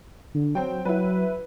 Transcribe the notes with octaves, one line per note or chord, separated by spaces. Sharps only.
D3
F#3 C4 G5
F#3 E4 B4